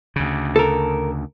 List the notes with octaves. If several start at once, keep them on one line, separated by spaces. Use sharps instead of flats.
D2 C#3
A4 A#4